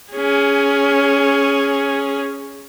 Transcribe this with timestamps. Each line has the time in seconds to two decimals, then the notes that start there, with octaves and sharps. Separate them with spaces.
0.13 C#4 G#4